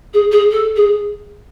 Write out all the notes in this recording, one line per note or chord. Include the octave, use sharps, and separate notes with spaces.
G#4
G#4
A4
G#4